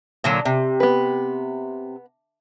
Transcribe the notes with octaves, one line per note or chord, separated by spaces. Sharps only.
A#2 D3 F#3
C3
B3 B4